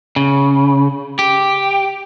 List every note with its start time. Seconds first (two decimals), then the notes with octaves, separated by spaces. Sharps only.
0.16 C#3
1.19 G4